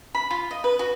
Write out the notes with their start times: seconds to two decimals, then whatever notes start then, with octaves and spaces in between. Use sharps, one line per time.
0.15 B5
0.31 F4
0.51 D#5
0.64 B4
0.79 F#4